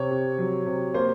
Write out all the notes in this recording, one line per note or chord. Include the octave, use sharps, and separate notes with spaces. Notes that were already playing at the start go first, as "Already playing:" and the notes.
Already playing: C3 C#5
C3
F#3
C3
A#3 C5